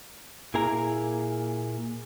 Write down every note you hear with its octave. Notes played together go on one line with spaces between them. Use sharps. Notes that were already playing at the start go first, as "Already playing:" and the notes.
A#2 A#3 E4 G#4 G#5 A#5